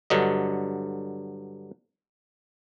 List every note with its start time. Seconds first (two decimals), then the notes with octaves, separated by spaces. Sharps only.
0.10 G2 D3 F#3 D#5